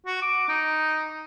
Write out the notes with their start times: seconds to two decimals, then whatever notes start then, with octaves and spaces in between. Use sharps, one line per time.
0.06 F#4
0.22 D6
0.48 D#4